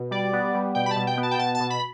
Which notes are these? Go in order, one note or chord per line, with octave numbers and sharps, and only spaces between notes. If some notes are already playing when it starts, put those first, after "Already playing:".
Already playing: B2
G3 D5
B3
G3
B2 G5
B5
A5
B2
G5
B3
A5
G5
B2 A5
A5
B2
B5